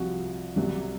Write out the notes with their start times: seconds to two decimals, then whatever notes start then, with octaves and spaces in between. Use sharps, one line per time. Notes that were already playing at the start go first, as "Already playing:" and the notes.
Already playing: C2 C3 F3 F#4
0.56 C2 C3 F#3